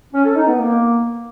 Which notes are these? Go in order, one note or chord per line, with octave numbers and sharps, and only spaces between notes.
C#4
A4
D#4
B3
A#3